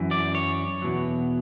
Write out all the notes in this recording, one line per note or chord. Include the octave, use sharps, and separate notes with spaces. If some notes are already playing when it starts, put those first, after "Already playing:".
Already playing: F#2 E3
D5
C#5
E2 B2 F#3